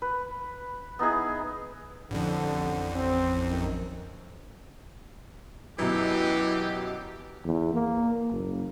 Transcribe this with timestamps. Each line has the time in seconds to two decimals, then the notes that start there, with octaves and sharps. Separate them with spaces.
0.02 B4
0.99 B3 D#4 E4 G#4
2.11 A1 F2 D3
2.95 C4
3.48 F#2 D#3
5.79 F#2 B2 E3 G4
7.45 E2
7.74 A#3
8.30 F#1